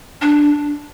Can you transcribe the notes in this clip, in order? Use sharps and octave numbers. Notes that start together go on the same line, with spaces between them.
D4